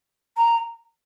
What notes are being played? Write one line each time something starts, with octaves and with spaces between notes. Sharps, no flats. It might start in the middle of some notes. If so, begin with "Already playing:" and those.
A#5